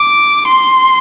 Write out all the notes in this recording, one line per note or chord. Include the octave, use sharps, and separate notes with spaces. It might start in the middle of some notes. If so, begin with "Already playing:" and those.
Already playing: D6
C6